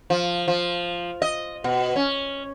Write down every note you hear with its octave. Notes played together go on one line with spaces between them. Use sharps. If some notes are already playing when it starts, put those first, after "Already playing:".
F3
F3
D#5
B2
C#4